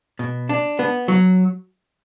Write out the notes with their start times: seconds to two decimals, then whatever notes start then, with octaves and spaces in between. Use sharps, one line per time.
0.19 B2
0.49 D4
0.79 B3
1.08 F#3